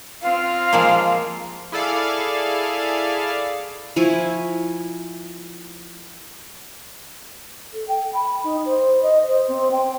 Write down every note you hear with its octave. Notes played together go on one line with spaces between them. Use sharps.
C4 F4 F5
F3 G#3 A#3
E4 G#4 A4 D5 F5
F3 E4 G#5 C#6
A4
G5
B5
D#4
C5
D#5
C5
C4
G5